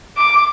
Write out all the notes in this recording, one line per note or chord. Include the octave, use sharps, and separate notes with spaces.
D6